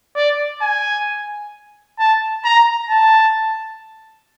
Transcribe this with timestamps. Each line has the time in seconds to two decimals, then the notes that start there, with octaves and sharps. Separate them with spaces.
0.16 D5
0.61 G#5
1.98 A5
2.44 A#5
2.89 A5